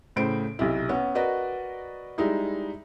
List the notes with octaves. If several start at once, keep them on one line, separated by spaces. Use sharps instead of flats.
A2 C#3 C5 D7
B1 C3 E4
B3 C#4
F#4 A#4 B4 D5 D#5
G3 G#3 D#4 E4